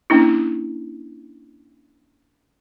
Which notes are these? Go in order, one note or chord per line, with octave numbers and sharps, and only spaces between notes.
A#3 C#4 D4 E4